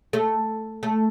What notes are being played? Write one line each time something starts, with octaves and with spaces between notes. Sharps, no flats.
A3
A3